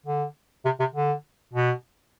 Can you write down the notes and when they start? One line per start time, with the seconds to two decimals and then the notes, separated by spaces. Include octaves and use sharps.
0.06 D3
0.65 C3
0.79 C3
0.94 D3
1.54 B2